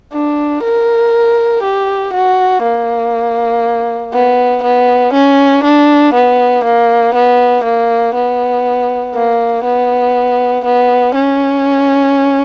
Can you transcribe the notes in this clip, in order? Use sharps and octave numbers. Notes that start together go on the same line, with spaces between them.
D4
A#4
G4
F#4
A#3
B3
B3
C#4
D4
B3
A#3
B3
A#3
B3
A#3
B3
B3
C#4